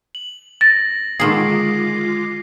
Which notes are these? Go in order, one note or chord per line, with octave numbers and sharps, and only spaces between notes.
F#7
A6 A#6
D3 D#3 G#3 F4 G#4 D6 C7